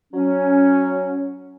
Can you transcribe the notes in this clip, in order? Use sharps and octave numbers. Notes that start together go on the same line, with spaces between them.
F#3 C#4